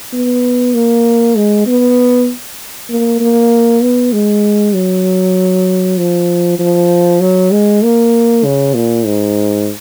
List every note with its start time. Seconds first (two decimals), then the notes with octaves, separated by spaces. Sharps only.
0.13 B3
0.74 A#3
1.36 G#3
1.66 B3
2.90 A#3
3.20 A#3
3.83 B3
4.13 G#3
4.74 F#3
5.98 F3
6.59 F3
7.21 F#3
7.51 G#3
7.83 A#3
8.45 C#3
8.74 A#2
9.06 G#2